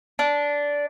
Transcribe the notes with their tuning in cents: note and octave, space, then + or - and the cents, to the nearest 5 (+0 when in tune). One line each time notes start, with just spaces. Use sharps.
D4 -15